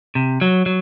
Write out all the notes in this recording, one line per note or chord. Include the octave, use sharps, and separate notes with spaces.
C3
F#3
F#3